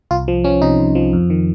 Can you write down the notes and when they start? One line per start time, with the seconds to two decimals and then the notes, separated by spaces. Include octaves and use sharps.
0.11 C2 F4
0.28 F3
0.44 F3 C#4
0.62 C3 D#4
0.79 C2
0.95 F3
1.13 F2
1.30 D#3